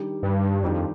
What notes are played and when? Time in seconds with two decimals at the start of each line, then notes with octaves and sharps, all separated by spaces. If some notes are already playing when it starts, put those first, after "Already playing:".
Already playing: D#3 G3 D4 G4
0.23 G2
0.63 F2 D#3 G3 D4 G4